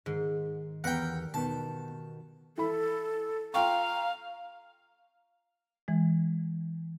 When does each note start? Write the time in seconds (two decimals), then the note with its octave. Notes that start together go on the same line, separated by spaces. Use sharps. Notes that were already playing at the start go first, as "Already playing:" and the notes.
0.06 G#2 D#3
0.84 E2 B3 G4 A#4 F#5 G5
1.34 B2 D#3 B3 A5 E7
2.58 E3 A4 B5
3.54 F4 F5 G5 A#5 C#6
5.88 E3 G#3